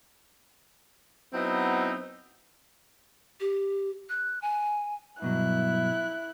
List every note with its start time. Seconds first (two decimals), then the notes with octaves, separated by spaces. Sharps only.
1.33 F#3 B3 C4 D#4 E4
3.40 G4
4.09 F#6
4.42 G#5
5.22 G2 B2 F#3 E4 F#6